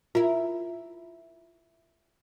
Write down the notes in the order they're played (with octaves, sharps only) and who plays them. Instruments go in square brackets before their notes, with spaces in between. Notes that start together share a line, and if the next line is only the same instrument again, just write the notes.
[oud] E4 A#4 [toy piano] F4